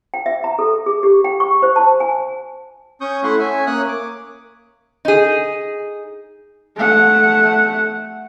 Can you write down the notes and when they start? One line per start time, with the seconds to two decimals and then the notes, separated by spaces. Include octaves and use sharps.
0.14 G5
0.26 E5
0.44 A#5
0.59 A4
0.86 G#4
1.03 G4
1.24 G5
1.40 C#6
1.62 C5
1.76 A5
2.00 G#5
3.01 C#4 C#6 D#6 G6
3.24 A3 E4 F#5 C6 C#6
3.39 C#4 E5 G#5
3.67 A#3 C#5 D#6 F#6
3.88 D6
5.05 D#4 G#4
6.77 A3 F#5